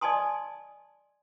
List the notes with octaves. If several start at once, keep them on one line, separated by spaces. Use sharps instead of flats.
D5 D#5 G#5 A5 C6 D#6